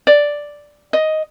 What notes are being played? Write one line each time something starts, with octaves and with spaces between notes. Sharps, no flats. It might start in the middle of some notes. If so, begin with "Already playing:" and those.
D5
D#5